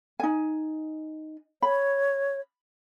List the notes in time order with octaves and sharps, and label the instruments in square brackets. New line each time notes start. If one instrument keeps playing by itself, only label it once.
[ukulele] D#4 G#5
[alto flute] C#5 [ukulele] B5